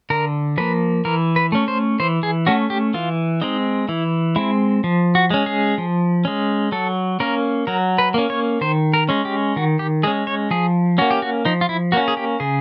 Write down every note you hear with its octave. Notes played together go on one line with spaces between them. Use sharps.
D3 A#4
F3 A#3 B4
E3 A#4
B4
A3 C#4
C5
E3 C5
G#4
A3 C#4 F#4
G4
E3 F4
G#3 C4 D#4
E3 E4
G#3 C4 E4
F3
F#4
G#3 C#4
G#4
F3
G#3 C#4
F#3 A4
A#3 C#4 A#4
F#3 A#4
B4
A#3 C#4
C#5
D#3 C5
A#4
G#3 C#4
G4
D#3 F#4
G4
G#3 C#4 G#4
C#5
F3 G#4
A#3 C#4 F#4
G4
F#4
F3 D#4
F4
E4
A#3 C#4 F#4
G#4
G4
C#3 G#4